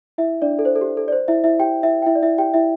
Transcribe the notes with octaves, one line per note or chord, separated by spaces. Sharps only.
E4 E5
D4 D5
A4
C5
A4
G4
A4
D5
C5
E4 E5
E4 E5
G4 G5
E4 E5
G5
E4 E5
D5
E4 E5
G4 G5
E4 E5